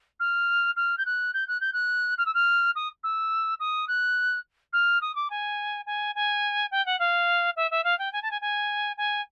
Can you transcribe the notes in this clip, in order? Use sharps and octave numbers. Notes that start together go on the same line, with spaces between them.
F6
F6
G6
F#6
G6
F#6
G6
F#6
F6
E6
F6
D#6
E6
D#6
F#6
F6
D#6
D6
G#5
G#5
G#5
G5
F#5
F5
E5
E5
F5
G5
G#5
A5
G#5
G#5
G#5